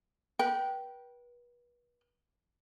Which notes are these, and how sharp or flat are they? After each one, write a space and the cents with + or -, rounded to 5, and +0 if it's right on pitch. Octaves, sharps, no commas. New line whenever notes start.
B4 -35 G5 -15